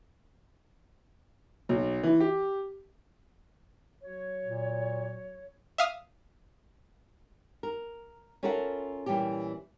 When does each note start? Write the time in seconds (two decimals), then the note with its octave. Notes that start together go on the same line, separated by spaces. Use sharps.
1.69 B1
2.03 E3
2.20 G4
4.03 F#3 F#4 C#5
4.44 A#2
5.78 E5 F5 D#6
7.63 A#4
8.43 C#4 F4 A4 A#4 E5 F#5
9.06 A#2 E3 G3 C#4 G4